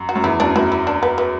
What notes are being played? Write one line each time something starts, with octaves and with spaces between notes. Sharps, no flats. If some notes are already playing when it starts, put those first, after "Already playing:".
Already playing: F#2
F#4
F#2
E2 E4
F#2 D4
F#2 E4
E4
D4
B3
B3